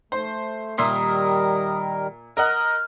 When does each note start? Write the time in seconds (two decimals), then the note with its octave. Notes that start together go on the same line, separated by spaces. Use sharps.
0.12 A3 C5
0.78 A#2 D#3 G3 A#4 E5 C6 D#6
2.37 A#4 D#5 F#5 F6